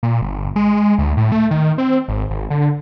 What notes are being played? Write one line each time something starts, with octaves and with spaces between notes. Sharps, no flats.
A#2
G1
G#3
D2
A2
A3
D#3
C4
G#1
G#1
D3